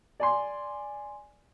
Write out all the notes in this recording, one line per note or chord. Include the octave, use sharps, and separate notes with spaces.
D5 G#5 C6